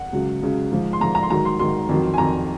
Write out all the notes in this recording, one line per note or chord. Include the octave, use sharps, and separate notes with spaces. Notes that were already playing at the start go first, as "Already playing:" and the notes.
Already playing: F#5
C#2 C#3 F#3
C#2 C#3 F#3
G#2 F3
C6
G#2 F3 A#5
A#5
C6
G#2 D#3 F#3 A#5
C6
G#2 D#3 F#3 C6
F2 D#3 F#3
G#5
F2 D#3 F#3 A#5